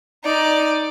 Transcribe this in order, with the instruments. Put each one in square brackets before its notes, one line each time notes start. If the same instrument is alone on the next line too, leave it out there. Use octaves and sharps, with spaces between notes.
[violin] D#4 [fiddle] D5